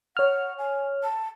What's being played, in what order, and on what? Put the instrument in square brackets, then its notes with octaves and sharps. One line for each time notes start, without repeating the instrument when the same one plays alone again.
[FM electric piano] C#5 F6 [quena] F#5
[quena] G#5
A5